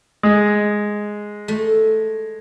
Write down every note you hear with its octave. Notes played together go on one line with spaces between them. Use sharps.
G#3
A3